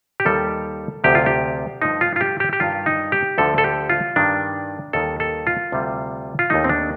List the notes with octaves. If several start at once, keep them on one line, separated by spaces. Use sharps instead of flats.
G4
D#2 D#3 G3 A4
D2 C3 F3 G4
F4
G4
G2 F3 A3 D#4
F4
F4
G4
G4
G4
G2 D#3 G3 F4
D#4
G4
D2 D3 F3 A4
A4
G4
F4
G2 D#3 G3 D4
D#2 D#3 G3 A4
A4
F4
D2 C3 G3
F4
D#2 D#3 A3 D#4
C4
D4